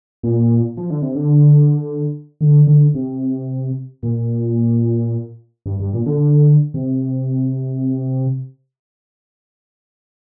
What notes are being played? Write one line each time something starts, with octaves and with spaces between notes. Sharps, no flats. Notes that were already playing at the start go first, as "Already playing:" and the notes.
A#2
F3
D3
C3
D3
D3
D3
C3
A#2
G2
G2
A#2
D3
C3